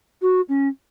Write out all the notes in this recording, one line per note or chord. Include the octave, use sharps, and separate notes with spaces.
F#4
C#4